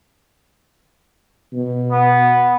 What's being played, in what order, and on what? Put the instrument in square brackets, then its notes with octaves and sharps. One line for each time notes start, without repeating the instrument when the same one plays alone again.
[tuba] B2
[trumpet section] B3